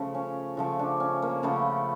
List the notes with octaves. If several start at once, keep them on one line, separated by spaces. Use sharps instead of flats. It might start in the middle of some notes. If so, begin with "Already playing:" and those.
Already playing: C#3 F3 A3
C#4
C#3 F3 A3 F#4
D4
C#4
A#3
C#3 F3 A3 B3